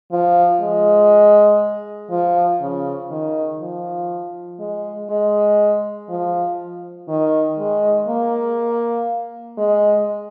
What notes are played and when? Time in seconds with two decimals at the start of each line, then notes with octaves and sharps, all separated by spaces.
0.11 F3
0.61 G#3
2.10 F3
2.61 C#3
3.10 D#3
3.60 F3
4.59 G#3
5.10 G#3
6.09 F3
7.08 D#3
7.58 G#3
8.08 A#3
9.57 G#3